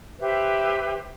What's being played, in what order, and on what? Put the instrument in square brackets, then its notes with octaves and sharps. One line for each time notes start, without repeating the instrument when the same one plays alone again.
[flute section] G4 B4 C5 E5